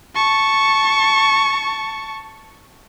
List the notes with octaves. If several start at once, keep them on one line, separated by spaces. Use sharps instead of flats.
A5 C#6